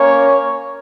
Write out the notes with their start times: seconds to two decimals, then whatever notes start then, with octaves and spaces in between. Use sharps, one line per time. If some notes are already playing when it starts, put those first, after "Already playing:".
Already playing: A#3 C#4 A#4 C#5